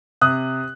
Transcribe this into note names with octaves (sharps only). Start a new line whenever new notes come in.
C3 D#6 F#6